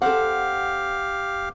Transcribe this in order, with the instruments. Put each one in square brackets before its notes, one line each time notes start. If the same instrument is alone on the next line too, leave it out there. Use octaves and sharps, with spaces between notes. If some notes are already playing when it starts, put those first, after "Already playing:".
[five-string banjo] C4 A4 [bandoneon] G4 F5 [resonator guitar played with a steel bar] F#5